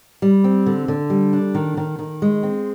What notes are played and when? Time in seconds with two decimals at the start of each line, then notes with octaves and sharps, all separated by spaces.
0.22 G3
0.44 C4
0.66 D3
0.88 D3
1.10 G3
1.33 D4
1.55 D#3
1.77 D#3
1.99 D#3
2.22 G#3
2.43 C4